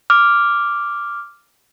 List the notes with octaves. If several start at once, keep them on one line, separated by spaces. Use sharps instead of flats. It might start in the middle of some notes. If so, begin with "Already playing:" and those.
D6 F6